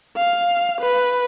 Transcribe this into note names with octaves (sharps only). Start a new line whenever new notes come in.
F5
B4